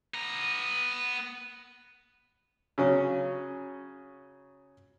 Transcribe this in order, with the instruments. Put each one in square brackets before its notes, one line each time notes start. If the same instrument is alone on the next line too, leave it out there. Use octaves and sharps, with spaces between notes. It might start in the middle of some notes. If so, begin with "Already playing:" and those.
[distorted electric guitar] B3 A#5
[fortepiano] C#3 F#3 C#4